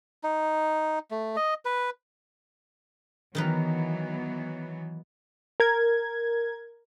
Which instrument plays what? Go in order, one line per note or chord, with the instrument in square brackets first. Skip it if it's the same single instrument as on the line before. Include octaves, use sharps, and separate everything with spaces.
[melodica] D#4
A3
D#5
B4
[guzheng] D#3 D#4 B4 [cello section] E3 F#3 B3
[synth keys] A#4 G#6